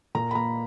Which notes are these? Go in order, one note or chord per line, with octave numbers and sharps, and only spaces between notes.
A#2 A#5
B5
A#3 A#5